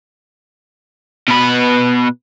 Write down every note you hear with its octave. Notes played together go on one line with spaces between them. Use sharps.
B2 B4